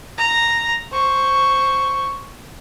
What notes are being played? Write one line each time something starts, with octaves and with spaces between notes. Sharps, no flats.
A#5
C5 C#6